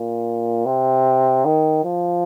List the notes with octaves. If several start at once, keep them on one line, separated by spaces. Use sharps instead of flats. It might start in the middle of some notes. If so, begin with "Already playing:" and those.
Already playing: A#2
C3
D#3
F3